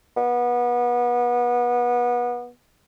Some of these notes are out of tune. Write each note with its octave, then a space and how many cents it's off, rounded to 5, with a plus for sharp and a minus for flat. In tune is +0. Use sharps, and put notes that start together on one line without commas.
B3 -25